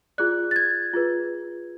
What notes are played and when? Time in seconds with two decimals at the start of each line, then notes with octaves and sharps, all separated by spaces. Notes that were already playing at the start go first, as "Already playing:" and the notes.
0.18 F4 G#4 D5 F#6
0.51 A6
0.56 G#6
0.93 F4 G#4 B4